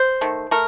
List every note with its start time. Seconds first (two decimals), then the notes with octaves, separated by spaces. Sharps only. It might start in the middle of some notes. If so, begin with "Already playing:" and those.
Already playing: C5
0.21 D#3 A3
0.51 A3 A#4